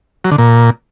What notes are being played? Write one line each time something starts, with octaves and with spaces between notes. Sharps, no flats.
F#3
D3
A#2